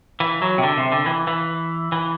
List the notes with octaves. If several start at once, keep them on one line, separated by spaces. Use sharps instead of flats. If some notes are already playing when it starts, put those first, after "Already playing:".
E3
F#3
C3
D3
C3
D3
E3
E3
E3